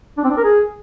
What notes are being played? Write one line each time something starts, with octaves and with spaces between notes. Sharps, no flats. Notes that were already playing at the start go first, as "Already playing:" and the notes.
D4
C4
D4
A#4
G#4